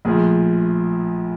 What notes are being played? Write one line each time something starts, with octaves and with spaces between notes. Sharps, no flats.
A#1 A2 F3 G#4